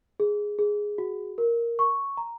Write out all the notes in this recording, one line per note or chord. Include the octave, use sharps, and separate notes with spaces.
G#4
G#4
F#4
A#4
C#6
A#5